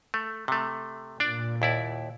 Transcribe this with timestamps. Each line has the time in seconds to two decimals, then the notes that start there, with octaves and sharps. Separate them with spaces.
0.14 A3
0.48 C3 A3
1.20 A#2 D4 D5
1.62 D#2 E4 D5